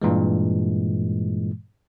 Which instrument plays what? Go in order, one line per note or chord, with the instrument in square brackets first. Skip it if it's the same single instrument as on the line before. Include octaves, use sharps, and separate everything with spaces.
[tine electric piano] G2 A#2 E3 G#3